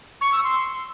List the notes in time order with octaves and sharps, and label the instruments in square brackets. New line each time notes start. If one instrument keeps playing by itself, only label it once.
[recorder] C#6
E6
C6